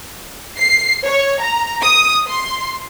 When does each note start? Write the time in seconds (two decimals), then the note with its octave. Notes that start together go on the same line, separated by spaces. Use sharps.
0.58 C7
1.04 C#5
1.40 A#5
1.82 D#6
2.27 C6